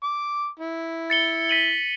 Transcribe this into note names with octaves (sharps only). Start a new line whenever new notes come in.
D6
E4
A6 C#7 G7
B6 D#7 F#7